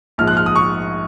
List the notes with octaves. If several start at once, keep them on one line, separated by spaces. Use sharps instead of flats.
A#1 G#2 F3 F6
F#6
F6
D#6
C#6